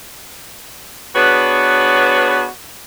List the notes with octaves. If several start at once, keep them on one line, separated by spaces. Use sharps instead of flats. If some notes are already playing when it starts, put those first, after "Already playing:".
B3 D4 F#4 G#4 B4 C#5